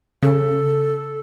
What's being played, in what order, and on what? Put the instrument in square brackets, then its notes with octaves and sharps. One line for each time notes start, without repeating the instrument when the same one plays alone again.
[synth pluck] C#3 [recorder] A4